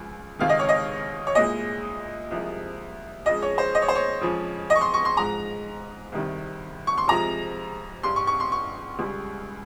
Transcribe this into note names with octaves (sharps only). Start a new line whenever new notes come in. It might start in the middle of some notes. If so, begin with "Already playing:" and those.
Already playing: C#2 C#3 F3
C#2 C3 D#3 F5
D#5
C#5
D#5
C#5
C2 A#2 G#3 D#5
C2 C3 F3 G#3
F2 C#3 G#3 D#5
C#5
C5
D#5
C#5
C5
C#5
F2 C#3 F3 G#3
D#5
C#6
C6
C#6
C6
G#2 F3 G#3 A#5
C2 C3 D#3 G3
C#6
C6
F2 C3 F3 G#3 A#5
G2 G3 C6
C#6
C#6
C6
C#6
C#2 C#3 G3